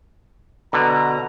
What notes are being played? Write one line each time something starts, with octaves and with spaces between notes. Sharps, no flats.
B2 D3 A#5